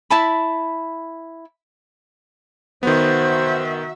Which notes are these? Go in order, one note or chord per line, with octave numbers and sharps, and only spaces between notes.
E4 A5 B5
D#3 B3 F#4 C5 E5